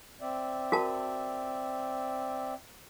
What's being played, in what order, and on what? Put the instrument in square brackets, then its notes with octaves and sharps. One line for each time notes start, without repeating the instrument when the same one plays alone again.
[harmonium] C4 D5 E5
[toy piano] F#4 A#4 A5